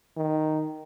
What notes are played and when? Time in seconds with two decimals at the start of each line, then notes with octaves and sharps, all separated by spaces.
0.17 D#3